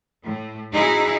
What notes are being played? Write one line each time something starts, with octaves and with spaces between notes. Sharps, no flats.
A2
C#4 D#4 E4 F#4 G#4